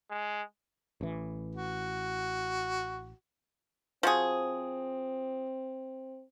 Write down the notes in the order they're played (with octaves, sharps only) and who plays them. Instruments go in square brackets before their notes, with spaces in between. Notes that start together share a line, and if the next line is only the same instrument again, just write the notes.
[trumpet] G#3
[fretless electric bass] A1 E3
[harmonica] F#4
[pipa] F3 F#4 G#4 [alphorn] C4